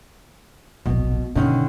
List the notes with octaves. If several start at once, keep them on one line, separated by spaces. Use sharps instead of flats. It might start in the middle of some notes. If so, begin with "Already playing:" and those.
D1 A#1 B2
G2 B2 D3 D#3 C#4